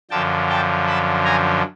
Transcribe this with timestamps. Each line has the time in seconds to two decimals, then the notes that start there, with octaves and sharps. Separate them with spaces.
0.11 F#2 D3 F3 G5 A5
0.49 G5 A5
0.87 A5 B5
1.25 G#5 A#5